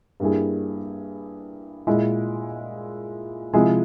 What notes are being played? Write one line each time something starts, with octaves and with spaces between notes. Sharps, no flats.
G2 G3 A#3 E4 G#4
A#2 G#3 E4
C3 F3 G#3 E4 G#4